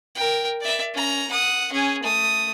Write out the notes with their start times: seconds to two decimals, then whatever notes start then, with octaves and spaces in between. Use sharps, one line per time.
0.15 A#4 G5
0.61 D5 E5
0.94 C#4 A#5
1.31 F#5 D#6
1.72 C#4 G#4
2.02 A3 D#6